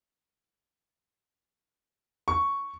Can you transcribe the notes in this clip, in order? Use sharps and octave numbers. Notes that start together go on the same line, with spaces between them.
C#6